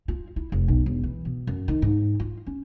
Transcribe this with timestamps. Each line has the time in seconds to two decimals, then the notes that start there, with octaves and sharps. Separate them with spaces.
0.08 F4
0.36 E4
0.52 F1
0.68 B1
0.86 E1
1.03 E3
1.25 B2
1.47 F#2
1.68 D#3
1.82 G#2
2.20 F4
2.46 C#4